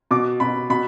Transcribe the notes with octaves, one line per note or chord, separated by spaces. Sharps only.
B2 D6
B2 B5
B2 B5